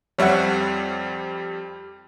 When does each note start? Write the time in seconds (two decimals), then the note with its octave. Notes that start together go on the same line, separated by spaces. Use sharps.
0.18 F2 G3 C4 C#5 E5 F#5